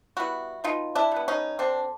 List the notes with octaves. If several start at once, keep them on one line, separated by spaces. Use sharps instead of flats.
G3 B3 E4 F#4
B2 D#4 F4
D4 E4
G3 B3
C#4 D#4
D3 C4 D4